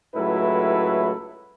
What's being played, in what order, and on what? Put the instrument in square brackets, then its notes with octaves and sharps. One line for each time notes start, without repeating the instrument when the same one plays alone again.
[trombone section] C#2 A2 F#3 E4 A4 B4